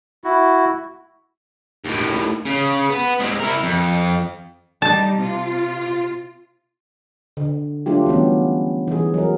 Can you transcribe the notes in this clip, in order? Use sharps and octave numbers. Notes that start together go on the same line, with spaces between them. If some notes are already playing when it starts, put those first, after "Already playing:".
E4 F#4
D#2 A2
C#3
B3
C3 G#3
E4 A#4
F2
G3 D#4 A5
C3 F4
D3
F#3 A3 D4 F4 G4
E3 G3 B3 C#4
E3 G#4
F#3 A#4